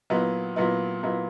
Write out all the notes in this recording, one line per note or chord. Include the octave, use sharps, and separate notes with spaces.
A#2 F#3 B3 E4
A#2 F#3 B3 E4
A#2 F#3 B3 E4